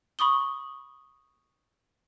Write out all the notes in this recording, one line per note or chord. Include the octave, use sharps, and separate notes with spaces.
B5 C#6 D#6 G7